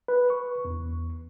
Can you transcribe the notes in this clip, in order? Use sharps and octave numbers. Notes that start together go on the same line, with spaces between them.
B4
C#6
E2